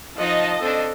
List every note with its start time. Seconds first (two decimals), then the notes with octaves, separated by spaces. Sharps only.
0.17 F3 D#4 D#5 F#5 A5
0.61 C4 D4 A4